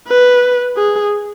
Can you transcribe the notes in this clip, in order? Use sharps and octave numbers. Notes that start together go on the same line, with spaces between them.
B4
G#4